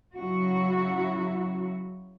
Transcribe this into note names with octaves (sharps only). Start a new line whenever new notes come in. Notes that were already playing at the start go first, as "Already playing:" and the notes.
C#3 F#3 E4 F#4